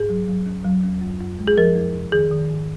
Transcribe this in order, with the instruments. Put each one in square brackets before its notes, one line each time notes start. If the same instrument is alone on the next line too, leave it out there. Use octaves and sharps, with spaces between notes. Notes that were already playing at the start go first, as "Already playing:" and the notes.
Already playing: [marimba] G#2 G#4
F#3
F#3
D#2
F#3
D#2
F#2
F#2
G#3
G#4
F3 A#4
F2
C3
D#3 G#4
D#3
G#2